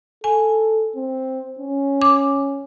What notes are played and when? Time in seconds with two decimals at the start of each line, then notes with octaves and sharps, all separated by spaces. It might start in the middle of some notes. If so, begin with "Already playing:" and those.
0.24 A4 G#5
0.96 C4
1.59 C#4
2.02 D6